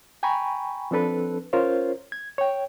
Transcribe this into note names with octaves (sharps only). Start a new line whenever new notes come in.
G5 G#5 A#5 B5 C#6
F3 C4 D4 A4 B4
C#4 F4 A#4 C5 C#5
G#6
C#5 G5